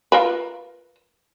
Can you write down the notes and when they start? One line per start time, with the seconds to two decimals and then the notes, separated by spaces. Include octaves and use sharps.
0.12 F4 A#4 B4